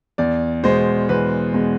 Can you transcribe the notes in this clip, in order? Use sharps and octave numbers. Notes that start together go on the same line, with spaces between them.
E2 D5
B2 G#3 C5
E2 B4
B2 G#3